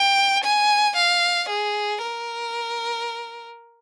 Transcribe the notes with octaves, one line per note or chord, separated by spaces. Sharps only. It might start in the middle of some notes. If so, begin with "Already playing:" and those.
Already playing: G5
G#5
F5
G#4
A#4